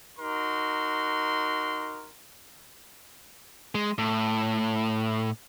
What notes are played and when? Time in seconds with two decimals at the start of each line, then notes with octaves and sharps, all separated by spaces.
0.20 D#4 F#4 A#4 C6
3.75 G#3
3.98 A2